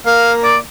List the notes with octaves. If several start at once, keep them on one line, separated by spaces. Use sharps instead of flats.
A#3 F5
D5